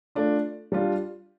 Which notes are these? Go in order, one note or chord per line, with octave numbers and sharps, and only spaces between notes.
A3 D4 F4
G3 D4 F4